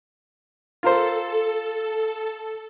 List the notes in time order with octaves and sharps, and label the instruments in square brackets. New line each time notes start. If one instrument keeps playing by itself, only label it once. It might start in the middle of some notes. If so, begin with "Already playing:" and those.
[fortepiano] F4 A#4 C5 [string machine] A4